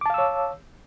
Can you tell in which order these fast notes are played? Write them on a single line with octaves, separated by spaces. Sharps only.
D6 A5 F5 E6 C#5